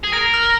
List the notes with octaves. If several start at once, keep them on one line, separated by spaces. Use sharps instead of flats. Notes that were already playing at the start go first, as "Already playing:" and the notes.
G#4
A#4 A#6
F6